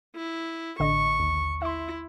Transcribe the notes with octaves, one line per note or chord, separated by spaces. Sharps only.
E4
A1 D3 D#5 C#6
D#2
E4 E5 C6